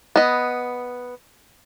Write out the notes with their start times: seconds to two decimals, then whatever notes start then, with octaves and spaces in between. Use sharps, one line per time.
0.16 B3 D#5